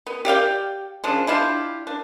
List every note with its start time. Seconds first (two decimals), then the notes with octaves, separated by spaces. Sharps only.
0.07 B3
0.25 G4 D5 F5 G5
1.04 C#3 F3 D4
1.27 D4 E4 F4 G4
1.87 D4